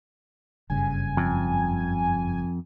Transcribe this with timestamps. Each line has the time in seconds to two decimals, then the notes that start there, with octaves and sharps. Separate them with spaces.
0.70 F#1 G2 C#3 G#5
1.17 F2